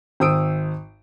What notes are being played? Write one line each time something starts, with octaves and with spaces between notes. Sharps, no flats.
G#1 C5 D#6 E6 D7